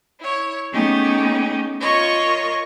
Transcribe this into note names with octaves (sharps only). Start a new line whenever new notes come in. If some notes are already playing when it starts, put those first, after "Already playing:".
E4 C#5
A3 B3 C#4 D#4 G4 G#4
F4 A#4 C#5 D#5 C#6